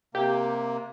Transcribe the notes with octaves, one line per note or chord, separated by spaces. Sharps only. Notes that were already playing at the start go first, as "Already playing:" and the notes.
C3 A#3 G4